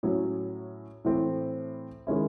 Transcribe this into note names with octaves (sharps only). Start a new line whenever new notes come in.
A2 F#3 C#4
A2 E3 A3 C4
D#3 G#3 C#4 E4